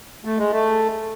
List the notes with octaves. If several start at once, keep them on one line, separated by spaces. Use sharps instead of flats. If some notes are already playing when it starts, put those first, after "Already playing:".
A3
G#3
A3